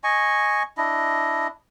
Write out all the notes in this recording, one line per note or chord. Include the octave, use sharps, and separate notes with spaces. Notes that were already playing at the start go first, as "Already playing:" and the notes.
D#5 G#5 C#6
D4 E4 D#5